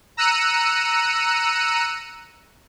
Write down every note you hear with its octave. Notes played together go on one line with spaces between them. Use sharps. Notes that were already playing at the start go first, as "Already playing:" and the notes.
A#5 E6 F#6 C#7 D#7